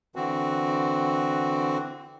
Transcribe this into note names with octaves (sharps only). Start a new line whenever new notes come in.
D3 E3 C4 F#4